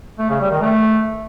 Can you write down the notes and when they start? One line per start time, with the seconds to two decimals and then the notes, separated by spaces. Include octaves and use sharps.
0.19 A3
0.29 C#3
0.40 G3
0.50 D#3
0.61 A3